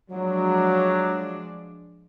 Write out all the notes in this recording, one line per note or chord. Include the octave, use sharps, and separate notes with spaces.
F3 F#3 G#3 D4